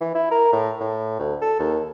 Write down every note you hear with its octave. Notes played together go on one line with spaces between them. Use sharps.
E3
E4
A#4
A2
A2
D2
A4
D#2